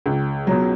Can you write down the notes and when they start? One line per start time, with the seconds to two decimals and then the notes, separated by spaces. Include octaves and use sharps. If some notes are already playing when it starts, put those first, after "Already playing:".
0.06 C#2
0.47 B2 F#3